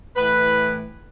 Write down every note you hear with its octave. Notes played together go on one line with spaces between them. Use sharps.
A2 E3 B4